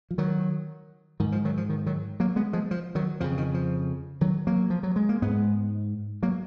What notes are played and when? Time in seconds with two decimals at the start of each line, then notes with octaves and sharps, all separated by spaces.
0.11 F3
0.18 D#3 F#3
1.20 G#2 D#3
1.32 F3
1.45 D#3 F#3
1.57 F3
1.69 D#3
1.86 D#3 F#3
2.20 F#3 A#3
2.36 G#3 B3
2.53 F3 G#3
2.71 F3
2.95 D#3 F#3
3.20 F2 C#3 F3
3.37 D#3
3.54 F3
4.21 D#3 F#3
4.47 F#3 A#3
4.70 F3
4.83 F#3
4.96 G#3
5.09 A#3
5.22 G#2 G#3 B3
6.23 F#3 A#3